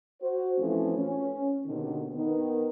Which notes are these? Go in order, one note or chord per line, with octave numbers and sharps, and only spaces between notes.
F#4 C5
A2 E3 F3 A3 C4 C#4
C#4
D#2 B2 D3 D#3
D#3 B3